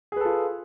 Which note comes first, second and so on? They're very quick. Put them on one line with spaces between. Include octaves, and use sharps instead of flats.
G#4 B4 A4 F4